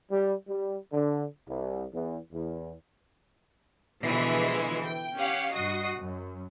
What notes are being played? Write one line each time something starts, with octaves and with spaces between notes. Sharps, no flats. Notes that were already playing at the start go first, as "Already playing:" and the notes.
G3
G3
D3
C2
E2
E2
B2 D3 E3 F3 G#3
G5
C#4 G4 F5 F#5
G2 F#4 D#5 D#6 C7
F#2